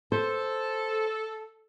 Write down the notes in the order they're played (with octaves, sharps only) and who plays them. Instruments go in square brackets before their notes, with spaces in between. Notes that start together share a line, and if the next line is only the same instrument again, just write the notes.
[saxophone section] A4 [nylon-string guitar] C5